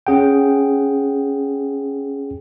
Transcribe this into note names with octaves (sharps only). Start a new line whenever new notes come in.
C#4 G#4 F#5 G5